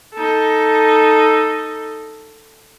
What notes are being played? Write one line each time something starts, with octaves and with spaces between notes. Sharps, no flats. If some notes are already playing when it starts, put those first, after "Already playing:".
D#4 A4